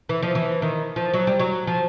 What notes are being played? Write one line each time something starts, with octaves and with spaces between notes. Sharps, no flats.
E3
F3
E3
D#3
F3
F#3
G3
F#3
F3